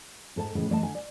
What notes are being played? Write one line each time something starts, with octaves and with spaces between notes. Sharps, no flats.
G#2 A4 C5 A5
A2 C#3 E3 G#3
E3 A3 D5 D#5 A5
D3 G#5
D5